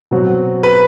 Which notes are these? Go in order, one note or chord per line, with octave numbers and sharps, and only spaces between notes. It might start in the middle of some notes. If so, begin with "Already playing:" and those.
B2 F#3 C4
B4